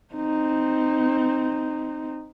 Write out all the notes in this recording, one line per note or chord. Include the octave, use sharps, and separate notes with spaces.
C4 D#4